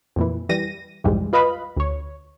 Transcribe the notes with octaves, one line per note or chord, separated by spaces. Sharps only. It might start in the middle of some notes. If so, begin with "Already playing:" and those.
F2 A#2 E3
E3 G3 A#6 D#7
B1 F2 G#2 E3 G3 G#3
F4 B4 D#5 F5 B5
D2 C#5